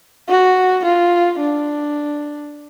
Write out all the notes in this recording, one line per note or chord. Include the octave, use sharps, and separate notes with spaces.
F#4
F4
D4